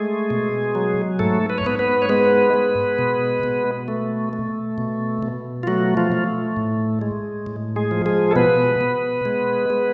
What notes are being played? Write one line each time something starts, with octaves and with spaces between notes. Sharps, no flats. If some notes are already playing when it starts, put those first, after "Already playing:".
Already playing: G#3 A3 G#4
B2
F#3
G#2 A3 A4
B4
C#5
G#2 B3 B4
B3 B4
C#5
G#3 B3 B4
G#3
B2
B2
A3
A3
B2
B2
F4
F#3 A3 F#4
F3 F4
A3
A2
G#3
A2
G#3 G#4
F3
G#3 G#4
A4
B2 B3 B4
B2
G#3
G#3